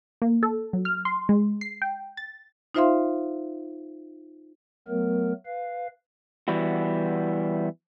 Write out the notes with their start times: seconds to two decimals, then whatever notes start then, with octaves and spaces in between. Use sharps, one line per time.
0.22 A#3
0.43 A4
0.73 F#3
0.85 F6
1.05 C6
1.29 G#3
1.61 C7
1.82 G5
2.17 A6
2.75 D#4 F4 C5 E5 F5 C6
4.88 F#3 A3 B3 A#4
5.46 B4 F5
6.48 E3 G3 B3 E4 F#4